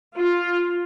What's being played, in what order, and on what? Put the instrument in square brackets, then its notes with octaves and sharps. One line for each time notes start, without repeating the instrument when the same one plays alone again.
[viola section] F4